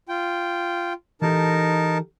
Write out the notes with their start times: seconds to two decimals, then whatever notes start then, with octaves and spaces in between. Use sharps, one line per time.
0.09 F4 G5
1.22 E3 D#4 G4 A4 A#4 A5